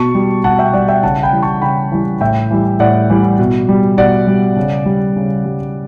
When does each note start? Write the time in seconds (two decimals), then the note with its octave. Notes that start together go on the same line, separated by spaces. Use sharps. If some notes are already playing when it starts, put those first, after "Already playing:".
Already playing: B2 A5 C#6
0.15 G3
0.44 B2 F#5 A5
0.59 E5 G5
0.73 G3 D5 F#5
0.88 E5 G5
1.03 C#3 F#5 A5
1.23 G5 B5
1.33 E3 G3
1.43 A5 C#6
1.62 C#3 G5 B5
1.92 E3 G3
2.21 A2 E5 G5
2.51 E3 G3
2.80 A2 D5 F#5
3.10 E3 G3
3.39 B2
3.69 G3
3.98 B2 D5 F#5
4.27 G3
4.56 C#3
4.86 G3
5.16 C#3
5.45 G3